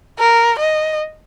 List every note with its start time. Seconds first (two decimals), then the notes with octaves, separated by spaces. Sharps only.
0.19 A#4
0.60 D#5